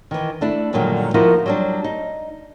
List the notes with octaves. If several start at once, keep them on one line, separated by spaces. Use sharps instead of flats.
D#3 E3
A3 D4 E4
F#2 A#2 D3 D#3 F#3 G3
F3 B3 D#4 E4 F#4 A#4
F#3 G3 D4
D#4